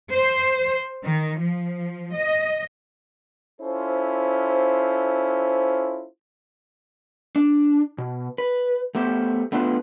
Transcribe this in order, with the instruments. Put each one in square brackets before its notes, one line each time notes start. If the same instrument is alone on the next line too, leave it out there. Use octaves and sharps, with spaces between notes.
[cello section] C5
D#3
F3
D#5
[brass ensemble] C#4 E4 F4 A4 C5
[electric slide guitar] D4
B2
B4
A3 B3 G4 C5
A3 B3 D4 F4 B4